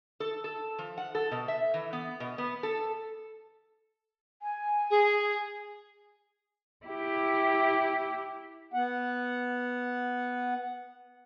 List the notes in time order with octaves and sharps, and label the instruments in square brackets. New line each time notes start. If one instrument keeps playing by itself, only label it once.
[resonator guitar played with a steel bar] A4
A4
F3
F#5
A4
B2
E5
E3
B3
B2
B3
A4
[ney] G#5
[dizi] G#4
[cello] E4 G4
[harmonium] B3 F#5